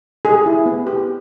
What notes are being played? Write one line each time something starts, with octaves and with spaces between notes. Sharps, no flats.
G4 G#4
E4
B3
G4